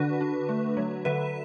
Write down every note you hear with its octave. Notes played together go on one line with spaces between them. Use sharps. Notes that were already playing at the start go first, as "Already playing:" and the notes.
Already playing: D3 D4 F#4 B4
D4
A3
F#3
D3 B4 E5